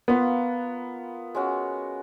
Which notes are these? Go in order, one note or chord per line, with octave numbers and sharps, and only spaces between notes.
A#3 B3 F4 B4
G#3 C#4 F#4